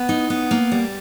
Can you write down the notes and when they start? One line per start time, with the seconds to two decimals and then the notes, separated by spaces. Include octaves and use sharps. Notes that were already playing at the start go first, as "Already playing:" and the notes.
Already playing: B3
0.09 D#4
0.30 B3
0.51 A#3
0.72 G3